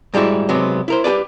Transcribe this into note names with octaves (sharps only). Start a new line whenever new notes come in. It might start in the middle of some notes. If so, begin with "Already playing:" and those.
G#2 G3 G#3 E4 F#4
C3 F#3 G#3 B3
E4 A#4 C5
G4 G#4 B4 D5